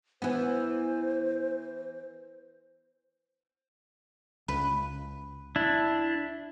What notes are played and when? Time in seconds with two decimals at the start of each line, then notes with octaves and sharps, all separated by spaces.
0.22 E3 B3 C5
4.48 C#2 B4
5.56 D4 E4